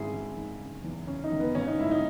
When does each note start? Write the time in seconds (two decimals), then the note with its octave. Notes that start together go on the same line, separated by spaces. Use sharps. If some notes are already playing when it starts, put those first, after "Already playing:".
Already playing: G#1 G#2 E4 G#4
0.13 G#1
0.36 D#3
0.60 F#1
0.84 E2
1.07 F#1 C#4
1.24 D#4
1.32 D#3
1.40 B3
1.55 G#1 C#4
1.67 D#4
1.79 G#2 E4
1.91 D#4